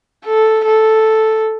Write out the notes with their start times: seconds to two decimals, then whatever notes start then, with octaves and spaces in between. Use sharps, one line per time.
0.25 A4
0.65 A4